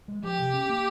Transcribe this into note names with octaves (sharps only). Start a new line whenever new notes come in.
G#3
F3 G4
C3
C#4
A#3